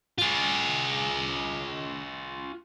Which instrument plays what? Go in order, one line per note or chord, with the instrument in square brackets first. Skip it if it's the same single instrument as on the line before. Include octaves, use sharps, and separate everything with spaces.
[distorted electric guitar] F4 G#4